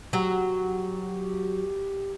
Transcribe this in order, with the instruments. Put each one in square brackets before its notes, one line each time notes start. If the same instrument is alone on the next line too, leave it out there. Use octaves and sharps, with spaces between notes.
[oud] F#3 [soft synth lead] G4